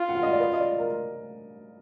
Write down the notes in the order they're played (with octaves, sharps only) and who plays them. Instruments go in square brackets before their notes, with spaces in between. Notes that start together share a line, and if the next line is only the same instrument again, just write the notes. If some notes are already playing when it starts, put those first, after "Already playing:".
Already playing: [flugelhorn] F4
[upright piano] F#5
F5
D#5
D5
B4
D#5
D5
A#4